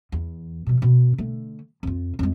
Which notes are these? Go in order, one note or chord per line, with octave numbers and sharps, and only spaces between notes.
E2
B2 F3
B2
D3 A3
F2 F4
F2 G#3